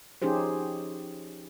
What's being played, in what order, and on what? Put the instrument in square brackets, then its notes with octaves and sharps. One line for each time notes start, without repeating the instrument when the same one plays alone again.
[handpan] F3 C#4 D#4 G4 G#4 C5